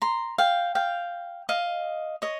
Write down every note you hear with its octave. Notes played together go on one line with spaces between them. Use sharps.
A#5 C6
F5 G5
F5 G5
D#5 F5
C#5 D#5